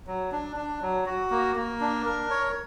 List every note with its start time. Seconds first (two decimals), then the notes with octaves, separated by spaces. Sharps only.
0.07 F#3
0.32 D4
0.56 D4
0.82 F#3
1.06 F#4
1.31 A#3
1.56 A#3
1.81 D4
2.05 A#4
2.30 C#5